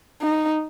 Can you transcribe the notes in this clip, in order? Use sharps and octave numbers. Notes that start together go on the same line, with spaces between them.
D#4